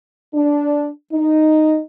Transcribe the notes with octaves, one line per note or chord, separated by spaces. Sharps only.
D4
D#4